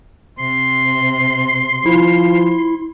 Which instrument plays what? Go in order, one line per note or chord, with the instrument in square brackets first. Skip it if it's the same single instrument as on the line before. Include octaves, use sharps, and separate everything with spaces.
[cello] C3 [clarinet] C6
[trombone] F3 [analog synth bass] E4